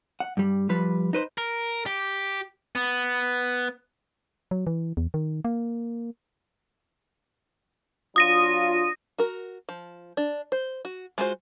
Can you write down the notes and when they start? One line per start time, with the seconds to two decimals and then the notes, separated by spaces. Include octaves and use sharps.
0.20 F#5
0.37 G2 G3
0.69 F3 G3 B4
1.13 D#4 B4 C5
1.38 A#4
1.86 G4
2.75 B3
4.51 F#3
4.67 E3
4.97 E2
5.14 D#3
5.45 A#3
8.16 F#3 D4 F4 D#6 A#6 D#7
9.18 F#4 A#4
9.69 F3
10.17 D4
10.52 C5
10.85 F#4
11.18 G#3 F4 F#4 A4 C5